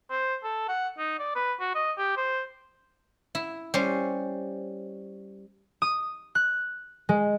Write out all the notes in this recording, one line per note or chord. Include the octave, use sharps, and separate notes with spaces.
C5
A4
F#5
D#4
D5
B4
F#4
D#5
G4
C5
E4
G3 C#4 C5
D#6
F#6
G#3